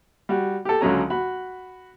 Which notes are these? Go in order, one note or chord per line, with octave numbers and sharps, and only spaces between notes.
G3 F#4
G4 A4
C#2 D3 F#3 C#4 A#5
F#4 B5